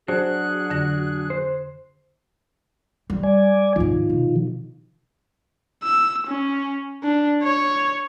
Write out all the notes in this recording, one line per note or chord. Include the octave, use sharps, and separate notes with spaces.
F#3 D4 F#4 G#4 C5 F#6
F2 D3 A#6
C5
G3
D5 G#5
D2 G#2 D#3 F3
B2
E6
C#4
D4
C#5